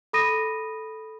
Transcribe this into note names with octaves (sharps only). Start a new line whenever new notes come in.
A4 B5 D#6 A#6 D#7